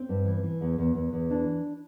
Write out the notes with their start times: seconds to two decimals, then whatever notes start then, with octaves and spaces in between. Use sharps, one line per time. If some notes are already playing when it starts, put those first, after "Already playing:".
Already playing: C4
0.09 G2
0.25 E3
0.43 E3
0.61 E2
0.78 E2
0.95 E2
1.13 E2
1.30 E3 D4